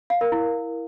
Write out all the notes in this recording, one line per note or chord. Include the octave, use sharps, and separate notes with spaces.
F5
A#4
E4